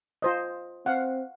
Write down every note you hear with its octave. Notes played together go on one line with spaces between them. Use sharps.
F4 C5 D#5
C4 F5 F#5